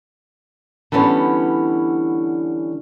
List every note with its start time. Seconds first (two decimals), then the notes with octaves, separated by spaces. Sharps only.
0.92 D3 E3 G3 B3 C#4